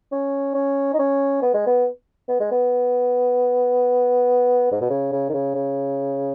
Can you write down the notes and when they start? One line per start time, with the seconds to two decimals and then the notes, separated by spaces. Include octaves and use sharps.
0.12 C#4
0.55 C#4
0.94 D#4
0.99 C#4
1.42 B3
1.54 G#3
1.67 B3
2.29 B3
2.40 G#3
2.52 B3
4.72 G#2
4.81 B2
4.90 C#3
5.13 C#3
5.29 D#3
5.34 C#3
5.55 C#3